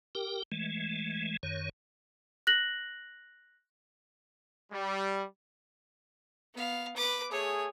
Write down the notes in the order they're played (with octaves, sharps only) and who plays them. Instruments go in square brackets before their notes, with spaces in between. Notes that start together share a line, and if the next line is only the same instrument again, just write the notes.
[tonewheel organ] G4 A#4 G5
E3 G#3 A3
F#2 D#3 C#5
[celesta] F#6 A#6 F#7
[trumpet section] G3
[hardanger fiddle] B3 F5
B4 D6
[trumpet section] A3 G#4 [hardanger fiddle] C#5